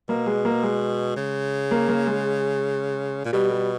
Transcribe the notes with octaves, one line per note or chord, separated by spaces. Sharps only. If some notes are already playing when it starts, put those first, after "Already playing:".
B2 A#3
G#3
A#3
G#3
C#3
A#3
A#3
G#3
A#2
B2 G3
G3